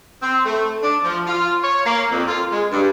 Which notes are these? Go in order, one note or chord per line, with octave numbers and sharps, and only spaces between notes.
C4
A3
D4
F3
F4
C#5
A#3
F2
F4
G#3
G2